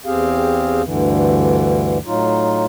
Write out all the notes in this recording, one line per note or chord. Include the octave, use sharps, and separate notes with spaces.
E2 C4 G4 G#4 F5
D2 G2 D3 E3
A2 F#3 D#4 F4